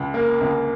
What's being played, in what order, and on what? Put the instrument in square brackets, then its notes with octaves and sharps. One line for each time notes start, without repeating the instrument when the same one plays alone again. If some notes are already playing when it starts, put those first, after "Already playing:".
Already playing: [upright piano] C#2
A#3
C#2